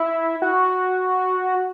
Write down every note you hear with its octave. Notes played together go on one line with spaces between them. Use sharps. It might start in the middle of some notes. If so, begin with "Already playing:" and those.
Already playing: E4
F#4